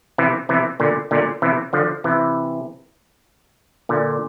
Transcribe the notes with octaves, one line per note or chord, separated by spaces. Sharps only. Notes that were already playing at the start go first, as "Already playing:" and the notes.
C3 E3
C3 E3
A#2 D3
A#2 D3
C3 E3
D3 F3
C3 E3
A#2 D3